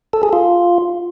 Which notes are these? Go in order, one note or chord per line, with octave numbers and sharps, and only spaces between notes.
A4
G#4
F4